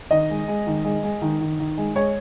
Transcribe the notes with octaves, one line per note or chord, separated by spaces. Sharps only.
D#3 D#5
G#3
G#3
D#3
G#3
G#3
D#3
D#3
D#3
G#3
G#3 C#5